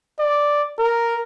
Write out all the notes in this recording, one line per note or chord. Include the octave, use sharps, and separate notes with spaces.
D5
A#4